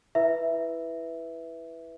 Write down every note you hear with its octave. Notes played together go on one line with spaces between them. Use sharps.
E4 B4 E5